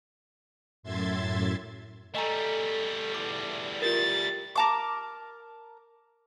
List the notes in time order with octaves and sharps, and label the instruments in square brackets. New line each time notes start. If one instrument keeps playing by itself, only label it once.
[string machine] F#2 A2 E5 C6 G#6 A6
[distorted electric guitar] G3 A3 [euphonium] A4 [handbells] D#5 G#5 A#5
[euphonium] E2 [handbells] D6
[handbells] F4 G4 A#4 [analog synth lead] A6
[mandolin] A#4 A5 D6